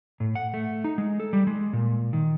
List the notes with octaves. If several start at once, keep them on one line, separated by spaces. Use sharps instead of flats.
A2
F#5
A3
D#4
G#3
A4
G3
G#3
A#2
D#3